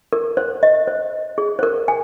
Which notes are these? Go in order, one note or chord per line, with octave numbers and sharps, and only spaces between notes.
A#4
C5
D#5
C5
G#4
C5
A#4
G#5